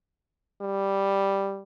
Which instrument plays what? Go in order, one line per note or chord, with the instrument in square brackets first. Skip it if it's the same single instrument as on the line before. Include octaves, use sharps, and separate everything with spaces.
[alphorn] G3